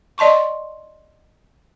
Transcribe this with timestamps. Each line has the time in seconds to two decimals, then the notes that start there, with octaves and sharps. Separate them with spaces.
0.18 D5 D#5 A5 C6 C#6